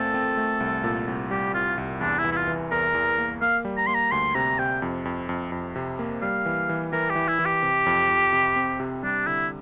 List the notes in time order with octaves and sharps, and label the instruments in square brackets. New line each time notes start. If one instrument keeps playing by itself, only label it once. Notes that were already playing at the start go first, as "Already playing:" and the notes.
Already playing: [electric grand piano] A#2 A3 C4 [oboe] A4
[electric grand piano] C4
A3
C2
A#2
C2
[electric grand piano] G3 [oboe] G4
[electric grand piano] C2 [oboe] F4
[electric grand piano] C2
[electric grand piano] E2 [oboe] D4
[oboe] E4
[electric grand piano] E3
[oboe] E4
F4
[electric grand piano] E3
[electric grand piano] E2 [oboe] A#4
[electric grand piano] E2
A#3
[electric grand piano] A#3 [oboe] F5
[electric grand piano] G3
[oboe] A#5
[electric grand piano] A#3 [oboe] C6
[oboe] A#5
[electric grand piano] D2 [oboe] C6
[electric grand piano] C3 [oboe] A#5
[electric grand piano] C3 [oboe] G5
[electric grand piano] F2
F2
F2
F2
C3
A#3
[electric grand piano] G3 [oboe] F5
[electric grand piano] E3
E3
[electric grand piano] E3 [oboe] A#4
[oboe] G4
[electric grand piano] E3
[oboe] E4
[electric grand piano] E3
[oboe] G4
[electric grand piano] C3
F2
F2
C3
C4
C3
[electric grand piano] G3 [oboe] D4
[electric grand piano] D3 [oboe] E4